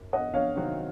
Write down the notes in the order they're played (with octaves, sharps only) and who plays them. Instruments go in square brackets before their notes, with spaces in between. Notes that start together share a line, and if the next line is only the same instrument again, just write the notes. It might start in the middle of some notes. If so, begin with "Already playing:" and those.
Already playing: [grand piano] G#1 F#2
[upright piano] D#5 F#5
C#5 F5
[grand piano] C3 D#3 F#3 C4 F#4